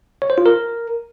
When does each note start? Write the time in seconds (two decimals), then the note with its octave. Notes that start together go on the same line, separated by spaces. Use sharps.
0.22 C#5
0.30 C5
0.38 F4
0.46 A#4